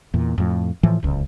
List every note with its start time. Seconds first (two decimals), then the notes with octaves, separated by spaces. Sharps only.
0.14 E2 A#2
0.38 F2 A2
0.83 A2 E3 F3
1.03 D1 C#2